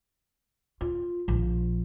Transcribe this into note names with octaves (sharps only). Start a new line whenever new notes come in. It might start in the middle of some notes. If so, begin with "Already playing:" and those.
F4
A#1 F3